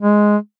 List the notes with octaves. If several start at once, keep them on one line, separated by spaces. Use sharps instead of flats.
G#3